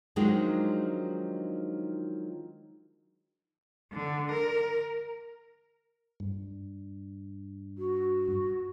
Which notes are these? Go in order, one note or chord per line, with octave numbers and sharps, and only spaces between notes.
D#3 F3 F#3 G#3 D4 D#4
D3
A#4
G2
F#4